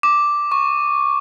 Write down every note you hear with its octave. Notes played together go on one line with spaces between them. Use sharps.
D6
C#6